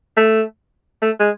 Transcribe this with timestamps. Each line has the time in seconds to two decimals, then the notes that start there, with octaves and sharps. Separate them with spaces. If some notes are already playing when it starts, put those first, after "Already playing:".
0.17 A3
1.02 A3
1.19 G#3